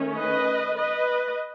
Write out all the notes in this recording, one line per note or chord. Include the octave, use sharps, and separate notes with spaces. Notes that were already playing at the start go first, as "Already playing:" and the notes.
Already playing: D#3 A3 C#4
B4 D#5
B4 D#5